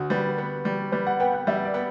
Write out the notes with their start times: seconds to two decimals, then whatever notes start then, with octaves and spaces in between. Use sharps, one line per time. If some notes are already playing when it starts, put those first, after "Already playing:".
Already playing: D2 F#4
0.10 G3 B4
0.38 B3
0.65 G3
0.92 G3 B4
1.07 F#5
1.20 B3 G5
1.33 F#5
1.47 G3 E5
1.65 D5
1.74 B3